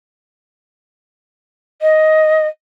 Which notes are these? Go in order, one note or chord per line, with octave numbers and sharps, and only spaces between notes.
D#5